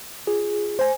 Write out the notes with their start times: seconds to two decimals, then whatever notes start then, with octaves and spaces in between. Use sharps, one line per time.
0.27 F4 G#4
0.79 C5 G#5